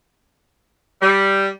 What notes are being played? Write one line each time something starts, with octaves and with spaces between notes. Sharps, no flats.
G3